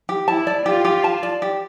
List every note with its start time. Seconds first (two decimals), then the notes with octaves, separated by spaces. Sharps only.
0.09 G4
0.27 E4 A5
0.47 D5
0.66 F4 G4
0.85 G4
1.04 A5
1.23 D5
1.42 G4